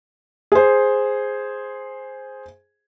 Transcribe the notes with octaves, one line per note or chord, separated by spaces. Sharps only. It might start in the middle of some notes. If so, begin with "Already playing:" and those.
G#4 C5